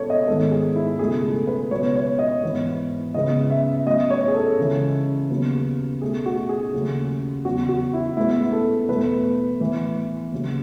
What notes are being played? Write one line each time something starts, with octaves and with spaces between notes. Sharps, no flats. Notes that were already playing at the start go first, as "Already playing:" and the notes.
Already playing: B2 G#3 B3 A4 C#5
D#5
G#2 D#3 G#3 B3 A4
G#4
E4
C#2 B2 F#3 A3 G#4
A4
B4
C#2 B2 F#3 B3 C#5
C#5
D#5
G#2 E3 B3
C#2 C#3 G#3 B3 D#5
E5
A2 F#3 B3 D#5
C#5
G#4
A4
C#2 C#3 E3
D#2 C#3 F#3 B3
B2 A3 G#4
F#4
G#4
D#2 C#3 F#3 A3
E2 C#3 F#3 F#4
F#4
E4
A2 G#3 B3 E4
A4
E2 B2 A3 B4
A2 E3 B3
D#2 C#3 F#3